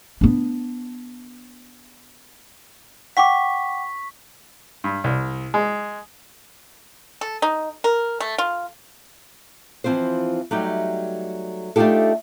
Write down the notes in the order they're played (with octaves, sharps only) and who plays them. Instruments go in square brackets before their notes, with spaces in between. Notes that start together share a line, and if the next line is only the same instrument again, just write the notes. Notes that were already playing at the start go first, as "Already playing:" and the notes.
[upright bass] B3 D4
[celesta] F#5 G5 D6 [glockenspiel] C#6 B6
[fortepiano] G2
C2
G#3
[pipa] A4
D#4
A#4
A3
F4
[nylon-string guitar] E3 F3 C4 F4 C5
F#3 G3 A3 D#4 G4
A3 D4 D#4 F4 G4 A4